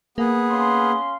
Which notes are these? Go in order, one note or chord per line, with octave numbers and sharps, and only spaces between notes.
A#3 B3 G#4
C#4 F5 C6